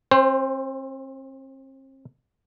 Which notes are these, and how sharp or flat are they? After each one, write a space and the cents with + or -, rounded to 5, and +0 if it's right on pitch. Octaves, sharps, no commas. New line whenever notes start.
C4 +40 C5 +0